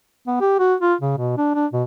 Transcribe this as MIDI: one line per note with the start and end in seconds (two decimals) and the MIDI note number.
0.27 0.36 59
0.40 0.55 67
0.59 0.75 66
0.81 0.94 65
1.01 1.14 49
1.17 1.34 47
1.38 1.54 62
1.55 1.66 62
1.73 1.83 47